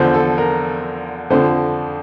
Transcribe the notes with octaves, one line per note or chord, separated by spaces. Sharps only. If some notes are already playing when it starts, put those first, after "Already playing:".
Already playing: E2 D3 F3 C5
A4
A#4
F2 D3 F3 C5